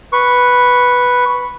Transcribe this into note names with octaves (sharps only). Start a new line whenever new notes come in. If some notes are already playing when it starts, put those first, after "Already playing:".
B4 C#6